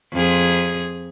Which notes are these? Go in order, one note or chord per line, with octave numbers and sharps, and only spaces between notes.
F2 G#4